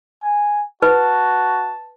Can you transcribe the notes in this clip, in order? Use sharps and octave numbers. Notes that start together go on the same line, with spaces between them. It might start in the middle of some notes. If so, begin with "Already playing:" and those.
G#5
F#4 B4 A5